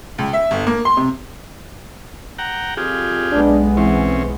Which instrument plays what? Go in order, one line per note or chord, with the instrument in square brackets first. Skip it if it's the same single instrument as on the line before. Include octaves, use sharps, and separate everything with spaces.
[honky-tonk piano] C#2
E5
G1
A#3
C6
C3
[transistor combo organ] F#5 G5 A#5
[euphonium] F2 [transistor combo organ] F4 G4 G#4
[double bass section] B1 G#3 B3 [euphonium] D4
[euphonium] E3 [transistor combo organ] C4 C#4